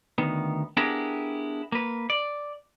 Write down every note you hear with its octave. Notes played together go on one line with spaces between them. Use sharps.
D2 D#3 B3
B3 D4 E4 G4 G#4 A#4
A#3 B4
D5